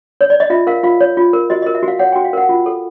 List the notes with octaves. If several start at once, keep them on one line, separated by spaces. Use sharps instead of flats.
C#5
D5
D#5
F4 E5
A#4 F5
F4 F5
C#5
F4
A#4
F#4 D#5
A#4 D#5
E5
F#4
F5
C#5 F#5
F#4 G5
F5
A#4 F#5
F4
A4